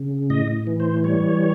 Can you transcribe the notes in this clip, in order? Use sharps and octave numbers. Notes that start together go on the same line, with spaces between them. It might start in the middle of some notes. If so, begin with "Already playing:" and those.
Already playing: C#3
A2 D#5
E3
C5
G3 C#5